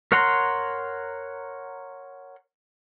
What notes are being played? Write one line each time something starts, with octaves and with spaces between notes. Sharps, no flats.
A#4 C#5 F#5 A#5 C6